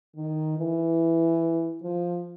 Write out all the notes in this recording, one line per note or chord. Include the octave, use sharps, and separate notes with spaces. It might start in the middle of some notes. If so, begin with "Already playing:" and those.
D#3
E3
F3